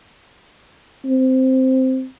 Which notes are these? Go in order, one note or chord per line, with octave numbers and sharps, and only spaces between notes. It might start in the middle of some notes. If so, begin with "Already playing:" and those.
C4